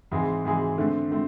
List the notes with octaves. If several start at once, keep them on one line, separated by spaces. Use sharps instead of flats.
G#2 E3 G#3 C4 G#4
G#2 E3 G#3 C4 G#4
D3 A3 C4
D3 A3 C4